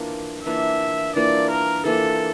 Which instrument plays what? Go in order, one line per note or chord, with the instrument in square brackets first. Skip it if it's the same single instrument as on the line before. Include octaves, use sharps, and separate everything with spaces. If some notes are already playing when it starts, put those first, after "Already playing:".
Already playing: [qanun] E3 A#3 D4 F4
[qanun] E3 A#3 D4 F4 [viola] E5
[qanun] E3 A#3 D4 F4 [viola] D5
[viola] A#4
[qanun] E3 A#3 D4 F4 [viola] A4